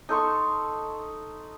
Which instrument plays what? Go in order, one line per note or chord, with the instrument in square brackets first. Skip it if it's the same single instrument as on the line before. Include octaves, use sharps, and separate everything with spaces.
[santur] D#4 A4 C6 C#6